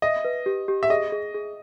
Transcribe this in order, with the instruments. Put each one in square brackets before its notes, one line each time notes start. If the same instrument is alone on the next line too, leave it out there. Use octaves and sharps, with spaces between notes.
[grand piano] D#5 [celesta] E5
[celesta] B4
G4
G4
[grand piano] E5
[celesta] G#4 [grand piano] D#5
[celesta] G#4
G#4